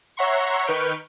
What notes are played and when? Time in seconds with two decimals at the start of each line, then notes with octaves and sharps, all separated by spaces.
0.17 C#5 E5 F#5 A#5 C6 C#6
0.67 D#3 B4 C#6 F6 G6 D7